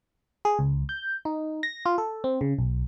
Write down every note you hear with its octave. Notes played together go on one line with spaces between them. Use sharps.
G#4
C#2
G6
D#4
A#6
F4
A4
C4
C#3
B1